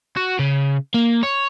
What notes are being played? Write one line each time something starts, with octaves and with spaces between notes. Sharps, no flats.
F#4
C#3
A#3
C#5